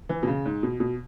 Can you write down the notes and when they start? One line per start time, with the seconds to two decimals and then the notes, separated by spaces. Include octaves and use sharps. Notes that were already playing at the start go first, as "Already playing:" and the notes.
0.09 E3
0.23 B2
0.27 C#3
0.46 G#2
0.63 B2
0.80 B2